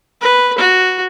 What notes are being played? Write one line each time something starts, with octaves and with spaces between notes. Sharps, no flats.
B4
F#4